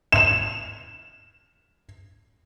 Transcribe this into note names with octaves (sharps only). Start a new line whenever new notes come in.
E7 F7